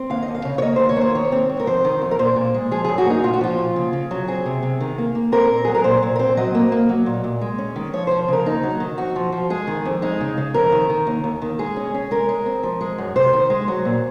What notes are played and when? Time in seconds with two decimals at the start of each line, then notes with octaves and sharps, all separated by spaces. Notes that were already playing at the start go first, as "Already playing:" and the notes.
Already playing: C4
0.10 D#2 F5
0.23 D#5
0.28 D#2
0.35 F5
0.45 C#3
0.58 C#5
0.62 A#3 D#5
0.76 D#2 C5
0.89 C#5
0.97 A#3 C5
1.15 D#3 C#5
1.32 C4
1.50 G#2
1.60 A#4
1.66 F2 C5
1.85 D#3
2.02 F2
2.11 A#4
2.19 A#2 C5
2.36 A#2
2.54 G#3
2.71 F3 G#4
2.85 F#2 G#4
2.98 F#4
3.06 A#3 D#4
3.24 A#2 F4
3.34 F#4
3.41 F3 F4
3.58 A#2
3.76 C#3
3.93 C#3
4.11 F#3
4.28 C4 G#4
4.46 C3
4.63 C3
4.80 D#3
4.98 A#3
5.15 A#3
5.32 C4 A#4
5.50 A#2
5.65 F#3 G#4
5.75 A#4
5.84 A#2 C5
6.03 A#2
6.16 A#4
6.19 C4 C5
6.37 F#3 D#5
6.55 A#3
6.72 A#3
6.89 F#3
7.06 A#2
7.24 A#2
7.41 G#3
7.58 C#4
7.76 D#3
7.93 F3 C#5
8.07 F3 C5
8.28 C#3 A#4
8.46 D#2 D#4
8.63 F#3
8.80 D#3
8.98 F2 F#4
9.16 F3
9.32 F3
9.50 G#3 G#4
9.67 D#3
9.85 F2
10.02 G#3 D#4
10.20 C#3
10.37 C#3
10.54 F2 A#4
10.72 D#3
10.89 D#3
11.07 D#2
11.24 D#2
11.42 D#3
11.59 G#3 G#4
11.76 C#4
11.94 C#4
12.11 G#3 A#4
12.29 G#3
12.46 C4
12.63 F3
12.81 G#3
12.98 F#2
13.16 C3 C5
13.33 D#3
13.50 G#3
13.68 F#3
13.85 A#2